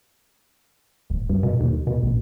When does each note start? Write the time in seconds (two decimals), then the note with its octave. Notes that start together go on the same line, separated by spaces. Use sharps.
1.10 D#1
1.29 G2
1.43 B2
1.60 D#2
1.87 B2
2.03 A#1